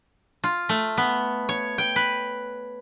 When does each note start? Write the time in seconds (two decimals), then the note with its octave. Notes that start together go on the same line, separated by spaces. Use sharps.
0.44 F4
0.69 A3
0.97 B3
1.49 C#5
1.78 G5
1.96 B4